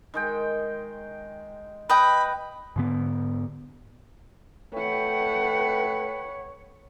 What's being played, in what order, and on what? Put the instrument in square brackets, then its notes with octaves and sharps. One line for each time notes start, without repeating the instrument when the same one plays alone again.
[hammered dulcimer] D#3 G#3 G5
[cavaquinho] B4 D#5 G5 [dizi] B5
[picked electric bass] G#2 D3 B3
[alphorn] A3 [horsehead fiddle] B4 F#5 [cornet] C#5 [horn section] G5